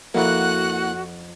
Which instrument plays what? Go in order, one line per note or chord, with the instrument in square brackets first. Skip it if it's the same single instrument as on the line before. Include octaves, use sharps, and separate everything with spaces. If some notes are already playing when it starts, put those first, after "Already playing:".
[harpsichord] F2 [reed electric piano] A#3 E4 [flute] F#4 [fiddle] F#5 F#6